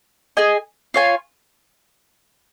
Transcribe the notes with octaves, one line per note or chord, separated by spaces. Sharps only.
G#4 D#5 G#5
F4 C#5 G#5